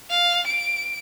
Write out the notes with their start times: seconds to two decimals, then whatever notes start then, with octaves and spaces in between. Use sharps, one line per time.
0.10 F5
0.47 D7